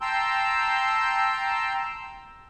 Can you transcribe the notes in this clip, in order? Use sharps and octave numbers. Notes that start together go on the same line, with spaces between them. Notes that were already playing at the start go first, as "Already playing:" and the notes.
G5 A5 A#5 C6 E6 G6